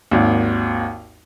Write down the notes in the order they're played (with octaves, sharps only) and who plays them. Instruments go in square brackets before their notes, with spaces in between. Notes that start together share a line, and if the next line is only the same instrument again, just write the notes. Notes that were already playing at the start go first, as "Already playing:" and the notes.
[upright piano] G#1 D#2